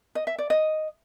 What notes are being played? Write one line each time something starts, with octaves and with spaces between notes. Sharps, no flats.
D#5
E5
D5
D#5